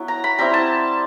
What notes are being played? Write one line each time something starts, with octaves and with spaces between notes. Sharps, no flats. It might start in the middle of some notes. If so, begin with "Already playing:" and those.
Already playing: F#3 B3 E4
A#5
B5
G3 C4 E4 A#5
A5